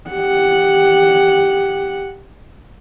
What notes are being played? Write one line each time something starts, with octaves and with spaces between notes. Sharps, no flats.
G4 F#5